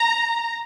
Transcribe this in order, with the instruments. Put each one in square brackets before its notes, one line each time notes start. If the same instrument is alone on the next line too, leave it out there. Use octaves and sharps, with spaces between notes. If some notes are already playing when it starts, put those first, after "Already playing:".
Already playing: [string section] A#5